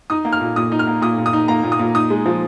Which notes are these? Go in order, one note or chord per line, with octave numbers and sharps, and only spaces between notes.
D#4 D#6
A#3
F6
A#2
A#2 D#6
D#4
F6
A#3
A#2 D#6
A#2
D#6
D#4
A#3 A#5
A#2
D#6
A#2
D#4 D#6
G#3
F3